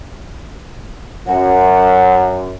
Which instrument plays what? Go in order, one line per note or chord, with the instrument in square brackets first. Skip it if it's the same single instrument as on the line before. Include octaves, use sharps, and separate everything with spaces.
[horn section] F#2 [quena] F#5